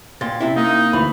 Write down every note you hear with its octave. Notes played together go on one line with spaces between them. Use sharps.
A#2 G5 C6 A6
C3 C#4 E4
A#3 D#4
D2 E3 B5